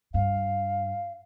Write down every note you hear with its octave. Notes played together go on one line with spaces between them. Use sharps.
G2 F5